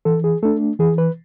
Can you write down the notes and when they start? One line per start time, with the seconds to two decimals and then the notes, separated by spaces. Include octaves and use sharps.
0.05 E3 A4
0.24 G#4
0.43 A3 D4 A4
0.79 E3 G#4
0.98 B4